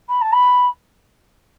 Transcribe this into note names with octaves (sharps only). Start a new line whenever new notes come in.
B5
A5
B5